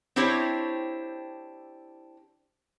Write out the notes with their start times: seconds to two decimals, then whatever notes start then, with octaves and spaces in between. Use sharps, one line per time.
0.16 C4 D4 E4 G4 C5 C#5